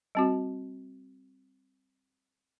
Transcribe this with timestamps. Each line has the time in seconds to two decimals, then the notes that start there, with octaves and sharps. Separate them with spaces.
0.15 G3 C4 F#4